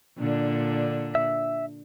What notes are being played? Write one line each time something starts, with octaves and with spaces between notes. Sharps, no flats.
A#2 D3 D4
E5